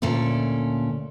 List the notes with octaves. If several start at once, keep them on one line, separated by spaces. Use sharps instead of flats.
D2 A#2 C#4 A4 D5